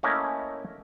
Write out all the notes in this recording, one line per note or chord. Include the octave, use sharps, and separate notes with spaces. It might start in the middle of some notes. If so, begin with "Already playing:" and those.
A3 A#3 C#4 E4 A#4 D#5